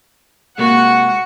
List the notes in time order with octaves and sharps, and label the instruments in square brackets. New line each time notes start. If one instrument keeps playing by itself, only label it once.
[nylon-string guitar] C3 G#3 A#3 [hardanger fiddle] F#4 [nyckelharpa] F#5